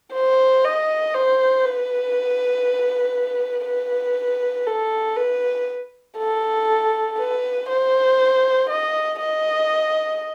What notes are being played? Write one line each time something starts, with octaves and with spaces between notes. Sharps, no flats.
C5
D#5
C5
B4
B4
A4
B4
A4
B4
C5
D#5
D#5